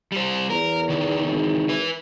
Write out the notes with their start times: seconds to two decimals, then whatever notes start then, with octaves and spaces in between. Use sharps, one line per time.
0.12 G3 C5
0.50 E2 A#4
0.89 D#3 E3
1.28 G#1
1.69 B4 E5